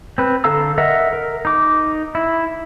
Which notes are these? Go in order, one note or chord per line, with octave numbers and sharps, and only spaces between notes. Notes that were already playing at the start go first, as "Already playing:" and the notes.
C4 B4
D3 A4 F5 A#5 E6
A#4 D#5 E5 F#5 E6
A#4
D#4 D6
E4